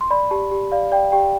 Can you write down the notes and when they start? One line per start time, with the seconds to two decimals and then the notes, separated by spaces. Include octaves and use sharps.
0.01 C6
0.10 D5 B5
0.31 G4 A5
0.52 G4
0.72 D5 F5
0.92 D5 G5
1.12 G4 G5